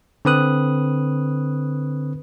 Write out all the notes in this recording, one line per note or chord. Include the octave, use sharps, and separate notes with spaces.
D3 C4 B4 D#6 F#6